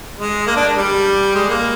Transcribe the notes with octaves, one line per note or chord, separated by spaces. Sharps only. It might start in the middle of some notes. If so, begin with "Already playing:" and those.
G#3
A#3
D4
G3
G#3
A#3